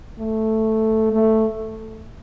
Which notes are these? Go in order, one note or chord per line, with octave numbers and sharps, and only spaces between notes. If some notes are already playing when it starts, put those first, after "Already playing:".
A3
A3